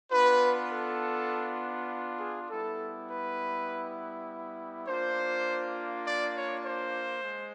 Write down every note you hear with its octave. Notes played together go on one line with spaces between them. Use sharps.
B3 D4 F4 B4
A4
G#4
G3 B3 E4 A4
B4
A#3 D4 F4 C5
D5
C#5
C5
G#3